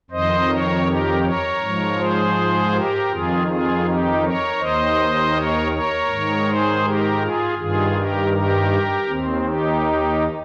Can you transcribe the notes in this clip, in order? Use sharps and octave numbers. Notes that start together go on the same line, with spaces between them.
F2 D#3 C5 D#5
A#4 C#5
G4 A#4
A#4 C#5
G#2 F3
G#4 C5
G4 A#4
F2 D#3 F4 G#4
F4 G#4
D#4 G4
A#4 C#5
D#2 D#3 C5 D#5
A#4 C#5
A#4 C#5
G#2 D#3
G#4 C5
G4 A#4
F4 G#4
G2 D#3 F4 G#4
G4 A#4
G4 A#4
D#2 D#3 C4
D#4 G4